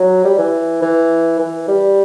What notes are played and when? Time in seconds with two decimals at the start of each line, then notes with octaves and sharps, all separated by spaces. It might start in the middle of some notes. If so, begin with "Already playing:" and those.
Already playing: F#3
0.25 G3
0.38 E3
0.82 E3
1.39 E3
1.68 G3